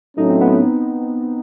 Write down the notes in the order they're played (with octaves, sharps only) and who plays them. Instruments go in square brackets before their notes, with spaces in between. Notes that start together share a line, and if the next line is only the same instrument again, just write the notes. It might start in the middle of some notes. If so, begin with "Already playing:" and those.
[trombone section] A2 F#3 A3 C#4 [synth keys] D#4
[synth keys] C4
B3
B3